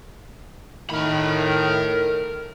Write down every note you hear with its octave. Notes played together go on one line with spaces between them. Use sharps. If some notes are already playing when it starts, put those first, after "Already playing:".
A2 D#3 A#4 B5